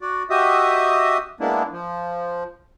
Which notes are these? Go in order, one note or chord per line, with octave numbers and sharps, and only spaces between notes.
F#4 D5
F#4 G4 D#5 E5 D#6
G#3 A#3 B3 D4 E4
F3